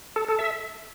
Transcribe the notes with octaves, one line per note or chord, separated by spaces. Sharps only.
A4
A4
E5